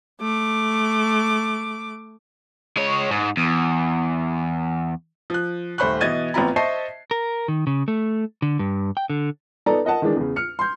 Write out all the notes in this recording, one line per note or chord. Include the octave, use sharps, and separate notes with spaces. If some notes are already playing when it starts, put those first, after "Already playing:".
A3 D6
G#3 C#5
G#2
E2
F3 F#6
D#1 A3 C5 B5 C#6 F#6
B2 E3 D#5 G#6 A6 D#7
A1 B3 C4 F4 A#5 B5
C5 D#5 E5 A5 C#6 C7
A#4
D#3
C#3
A3
D3
G2
G5
D3
B3 D#4 A4 D5 A#5
A#4 D#5 F#5 A5
D#3 E3 G#3 D4
E2 C#3
F6 C#7
C6 G6